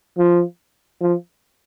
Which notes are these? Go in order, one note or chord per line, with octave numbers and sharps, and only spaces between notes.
F3
F3